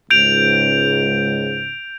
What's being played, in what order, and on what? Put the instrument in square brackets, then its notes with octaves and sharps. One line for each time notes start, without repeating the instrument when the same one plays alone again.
[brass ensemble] C#2 G#2 [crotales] G6 D7 F7